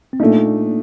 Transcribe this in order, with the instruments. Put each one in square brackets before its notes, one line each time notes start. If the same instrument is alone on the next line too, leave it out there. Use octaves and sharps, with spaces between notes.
[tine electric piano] C4
[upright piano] A#2 A3 D#4 [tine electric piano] A#3 D4